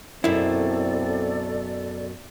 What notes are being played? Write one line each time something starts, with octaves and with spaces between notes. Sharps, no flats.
F#2 B2 C4 E4 A4 D5